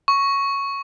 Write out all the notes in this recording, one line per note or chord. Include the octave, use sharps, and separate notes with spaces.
C#6